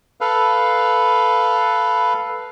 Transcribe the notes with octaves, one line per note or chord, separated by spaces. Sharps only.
A4 B4 F5